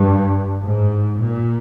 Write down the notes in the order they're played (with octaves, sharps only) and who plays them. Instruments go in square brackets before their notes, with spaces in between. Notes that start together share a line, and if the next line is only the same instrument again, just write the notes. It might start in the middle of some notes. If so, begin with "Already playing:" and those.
Already playing: [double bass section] G2
G#2
A#2